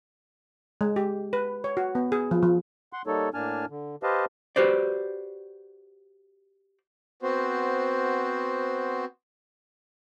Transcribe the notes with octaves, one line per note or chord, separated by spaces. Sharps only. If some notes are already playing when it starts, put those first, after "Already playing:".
G#3
G4
B4
C#5
F#4
B3
G#4
F3
F3
F#5 C6
G3 A#3 D#4 A4 C#5
A2 A#3 D4 G#5 A5 F6
D3
G4 B4 C5 D#5 F5 A5
F#4 G4 B4 C5 D5
B3 C4 F#4 C5